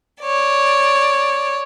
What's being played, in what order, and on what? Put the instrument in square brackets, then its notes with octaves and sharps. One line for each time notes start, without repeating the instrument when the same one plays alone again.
[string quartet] C#5 D5